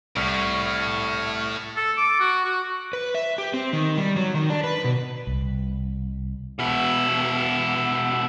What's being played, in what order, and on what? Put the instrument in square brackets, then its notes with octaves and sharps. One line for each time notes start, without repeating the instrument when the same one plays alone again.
[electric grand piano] C2 [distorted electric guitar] A2 [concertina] C#6 F6
[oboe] A4
D6
F#4
F#4
[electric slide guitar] B4
E5
G4
C4
D#3
G3
F#3
D#3
D4
B4
B2
[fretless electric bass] C2
[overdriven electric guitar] B2 E4